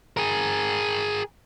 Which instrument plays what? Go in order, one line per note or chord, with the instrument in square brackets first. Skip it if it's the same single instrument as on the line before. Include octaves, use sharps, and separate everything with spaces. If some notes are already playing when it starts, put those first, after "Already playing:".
[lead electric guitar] G#4 A#4